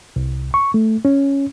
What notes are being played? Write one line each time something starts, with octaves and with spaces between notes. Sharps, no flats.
C2
C#6
A3
C#4